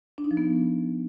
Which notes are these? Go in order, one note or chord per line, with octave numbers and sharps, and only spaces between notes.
D4
D#4
F3
B3